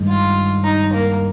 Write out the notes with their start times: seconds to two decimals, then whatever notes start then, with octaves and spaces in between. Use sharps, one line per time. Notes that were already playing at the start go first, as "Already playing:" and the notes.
Already playing: G2 D#3 G#3
0.08 F4
0.64 D#4
0.93 A#3